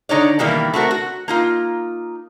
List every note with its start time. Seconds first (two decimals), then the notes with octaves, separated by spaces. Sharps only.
0.09 D3 D#4 C#5 D5
0.39 B2 D#3 E3 G3 A#3
0.74 A3 C4 F#4 A#4
0.91 F#4
1.28 A#3 D#4 F4